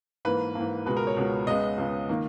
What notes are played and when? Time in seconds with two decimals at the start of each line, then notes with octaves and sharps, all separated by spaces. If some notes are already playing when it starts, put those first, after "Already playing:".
0.25 G#2 E3 A#3 B4
0.55 G#2 E3 A#3
0.86 C#2 B2 G#3 B3 B4
0.97 A#4
1.07 C#5
1.17 C#2 B2 G#3 B3
1.47 C#2 C#3 G#3 B3 D#5
1.78 C#2 C#3 G#3 B3
2.09 D#3 A#3